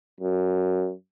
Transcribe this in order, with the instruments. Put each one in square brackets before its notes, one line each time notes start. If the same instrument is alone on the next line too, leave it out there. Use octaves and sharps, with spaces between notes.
[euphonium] F#2